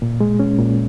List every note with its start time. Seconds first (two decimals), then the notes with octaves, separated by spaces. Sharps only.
0.02 A#2
0.20 G#3
0.40 C#4
0.58 A#2